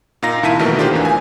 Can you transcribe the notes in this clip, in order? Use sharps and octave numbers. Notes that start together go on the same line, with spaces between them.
A#2 D#4 F5 A#5 A#6
C2 D#3 E4 A5 B6 D#7
B2 D#3 E3 F#3 A3 A#3
D4 F4 G4 A#4 C5
G#1 E2 E3
G#5